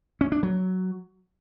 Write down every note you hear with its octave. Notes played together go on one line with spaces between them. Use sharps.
C#4
D4
F#3